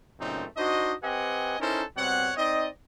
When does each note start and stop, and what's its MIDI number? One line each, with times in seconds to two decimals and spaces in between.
0.20 0.45 42
0.20 0.45 46
0.20 0.45 49
0.20 0.45 57
0.20 0.45 60
0.20 0.45 63
0.57 0.94 62
0.57 0.94 63
0.57 0.94 66
0.57 0.94 72
0.57 0.94 75
1.03 1.59 60
1.03 1.59 67
1.03 1.59 71
1.03 1.59 75
1.03 1.59 78
1.03 1.59 80
1.60 1.83 61
1.60 1.83 63
1.60 1.83 64
1.60 1.83 69
1.60 1.83 70
1.60 1.83 72
1.97 2.31 47
1.97 2.31 55
1.97 2.31 60
1.97 2.31 73
1.97 2.31 78
2.37 2.67 60
2.37 2.67 63
2.37 2.67 74
2.37 2.67 75